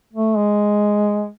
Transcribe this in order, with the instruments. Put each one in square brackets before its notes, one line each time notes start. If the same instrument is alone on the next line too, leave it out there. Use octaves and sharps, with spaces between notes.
[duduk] A3
G#3